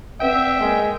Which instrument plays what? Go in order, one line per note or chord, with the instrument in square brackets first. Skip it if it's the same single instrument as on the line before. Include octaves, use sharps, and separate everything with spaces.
[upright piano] C4 B4 F#5 [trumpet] E5 [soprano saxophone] G5
[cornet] G#3 [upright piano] A#3